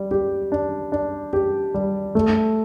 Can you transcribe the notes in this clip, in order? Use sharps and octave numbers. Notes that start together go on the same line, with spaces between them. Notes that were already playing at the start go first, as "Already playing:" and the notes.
Already playing: G3
G4
D4
D4
G4
G3
A3